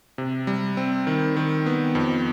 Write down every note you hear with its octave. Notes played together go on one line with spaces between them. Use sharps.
C3
G3
C4
D#3
D#3
B3
F2